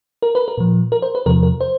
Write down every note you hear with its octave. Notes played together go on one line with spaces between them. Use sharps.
A#4
B4
A#4
A#2 F3
A#4
C5
B4
E2 C3 F3 A#4
A#4
C5